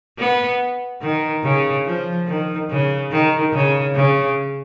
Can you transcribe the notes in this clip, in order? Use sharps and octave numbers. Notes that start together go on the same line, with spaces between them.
B3
D#3
C#3
F3
D#3
C#3
D#3
C#3
C#3